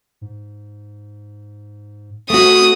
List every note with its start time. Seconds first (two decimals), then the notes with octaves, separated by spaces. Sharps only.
0.21 G#2
2.30 E1 A3 C4 F#4 D#6